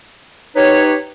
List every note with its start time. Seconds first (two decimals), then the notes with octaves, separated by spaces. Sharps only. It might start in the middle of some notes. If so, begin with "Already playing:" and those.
0.56 D#4 G4 B4 C#5